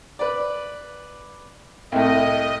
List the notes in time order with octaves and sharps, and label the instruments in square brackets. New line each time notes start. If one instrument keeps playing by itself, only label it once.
[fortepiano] B4 D5
[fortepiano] C2 A2 [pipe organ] D#5